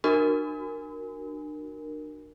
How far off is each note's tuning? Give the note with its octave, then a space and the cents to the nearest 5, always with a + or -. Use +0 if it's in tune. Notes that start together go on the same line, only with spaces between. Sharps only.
D4 +45 F#4 +0 A#4 +0